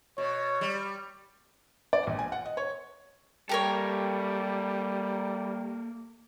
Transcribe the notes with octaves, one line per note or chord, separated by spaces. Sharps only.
B2 C#5
G3
D5
A#1
G#5
F#5
D#5
C#5
G3 A#3 G4 A4 A#4 C#5